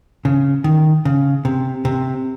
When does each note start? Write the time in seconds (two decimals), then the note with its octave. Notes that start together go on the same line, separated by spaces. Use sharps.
0.25 C#3
0.64 D#3
1.05 C#3
1.45 C3
1.85 C3